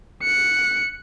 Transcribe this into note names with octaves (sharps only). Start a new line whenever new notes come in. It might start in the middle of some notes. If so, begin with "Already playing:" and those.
F#6 C#7